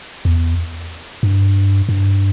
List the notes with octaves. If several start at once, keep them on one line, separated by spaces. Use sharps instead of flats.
E2
G2
G2